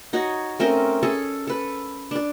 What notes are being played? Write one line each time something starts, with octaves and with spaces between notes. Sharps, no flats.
D#4 F#4 C#5
A3 C4 C#4 A#4
C#4 G#4 A4
A4 B4
D4 D5